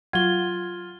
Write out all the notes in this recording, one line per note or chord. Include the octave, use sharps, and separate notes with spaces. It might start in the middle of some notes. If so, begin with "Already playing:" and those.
F#3 F4 F#5 G#6 G7